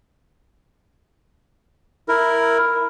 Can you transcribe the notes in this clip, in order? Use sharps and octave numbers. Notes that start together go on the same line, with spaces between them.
E4 A#4